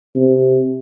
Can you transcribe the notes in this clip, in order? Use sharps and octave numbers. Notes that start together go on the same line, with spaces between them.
C3